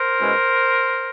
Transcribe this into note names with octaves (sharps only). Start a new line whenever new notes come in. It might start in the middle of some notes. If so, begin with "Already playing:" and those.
Already playing: A#4 C5
B2 G#3 C#4 E4